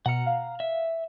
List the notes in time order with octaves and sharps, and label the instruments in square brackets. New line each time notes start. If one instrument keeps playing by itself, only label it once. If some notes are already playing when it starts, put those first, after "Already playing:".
[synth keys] B2 C#7 [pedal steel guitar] F#5 A#5 F6
[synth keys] F5
[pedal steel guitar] E5